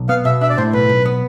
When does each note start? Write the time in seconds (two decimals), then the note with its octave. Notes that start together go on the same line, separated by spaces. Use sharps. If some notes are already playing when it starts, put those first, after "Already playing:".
Already playing: B1
0.09 B3 F5
0.25 B2 E5
0.41 D4 E5
0.50 D5
0.57 A2 C5
0.73 B1 B4
0.89 B1
1.06 B3